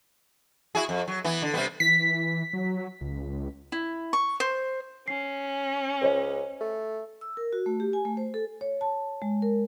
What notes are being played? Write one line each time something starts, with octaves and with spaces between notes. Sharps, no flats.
E4 F#4 G#4
F2
F#3
E3 B3
D3
C3 G3 B3
E3 B6
F#3
C#2
E4
C#6
C5
C#4 C7
C#2 C5 C#5 D#5
A3
E6
A#4
F#4
A3
G4
G#5
A3
C5
A4
C#5
A5
G#3
A#4